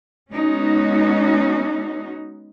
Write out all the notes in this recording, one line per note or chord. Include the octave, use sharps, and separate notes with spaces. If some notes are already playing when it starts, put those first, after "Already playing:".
G#3 B3 C#4 D#4 F#4